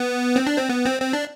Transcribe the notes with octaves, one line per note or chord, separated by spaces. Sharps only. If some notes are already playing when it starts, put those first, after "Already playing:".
Already playing: B3
C4
D4
C4
B3
C4
C4
D4